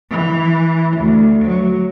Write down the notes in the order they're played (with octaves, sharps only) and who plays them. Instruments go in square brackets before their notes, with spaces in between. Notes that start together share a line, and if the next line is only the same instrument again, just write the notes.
[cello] E3
D2
F#3